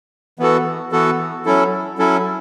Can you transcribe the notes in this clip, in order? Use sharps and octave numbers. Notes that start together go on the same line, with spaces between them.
E3 B3 F#4 A4
E3 B3 F#4 A4
F#3 C#4 E4 A4
F#3 C#4 E4 A4